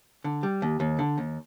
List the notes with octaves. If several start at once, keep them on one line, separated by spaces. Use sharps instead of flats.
D3
G3
D#2
D#2
D3
D#2